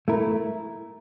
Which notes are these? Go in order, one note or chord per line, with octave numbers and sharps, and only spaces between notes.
A3 E4 A#4